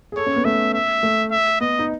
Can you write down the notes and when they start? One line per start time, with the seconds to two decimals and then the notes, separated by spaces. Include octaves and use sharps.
0.12 G#4
0.17 A4 C#5
0.26 C#4
0.36 B3
0.45 A3 E5
0.74 E5
1.03 A3
1.31 E5
1.60 B3 D#5
1.79 D#4